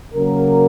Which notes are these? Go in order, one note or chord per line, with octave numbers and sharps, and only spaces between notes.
C#3 F#3 A#3 A#4